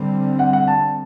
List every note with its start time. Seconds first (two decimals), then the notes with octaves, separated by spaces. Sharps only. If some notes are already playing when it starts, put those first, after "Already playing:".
Already playing: D3 G3 C4
0.39 F#5
0.53 F#5
0.68 A5